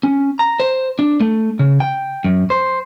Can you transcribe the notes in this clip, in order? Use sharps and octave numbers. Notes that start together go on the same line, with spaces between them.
C#4
A#5
C5
D4
A3
C#3
G5
F#2
C5